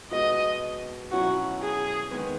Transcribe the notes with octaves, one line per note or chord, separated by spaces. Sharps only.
B2 G#3 B3 F#4 D#5
B2 F#3 C#4 E4 F#4
G#4
D#3 G#3 B3